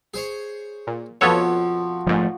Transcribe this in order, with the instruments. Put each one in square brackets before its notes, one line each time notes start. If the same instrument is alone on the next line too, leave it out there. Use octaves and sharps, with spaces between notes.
[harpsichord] G#4 C5 C#5
[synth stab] A#2
[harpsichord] F2 B2 [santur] F3 F#4 [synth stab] B3 A4 C#5
[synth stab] A#1 G#2 [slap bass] F3 G3 A3